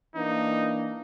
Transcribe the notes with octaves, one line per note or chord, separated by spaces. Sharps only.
E3 A#3 D4 D#4